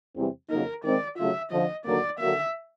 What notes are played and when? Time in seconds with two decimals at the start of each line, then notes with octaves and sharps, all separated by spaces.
0.16 E2 C3 E3 G3 C4
0.50 F2 C#3 F#3 A#3 D#4 A#4
0.83 D#3 G#3 C4 D5
1.17 C#3 F#3 A3 C#4 F4 E5
1.52 F2 D3 F3 D#5
1.86 D#2 D3 F#3 A#3 D5
2.19 D3 F#3 A#3 E5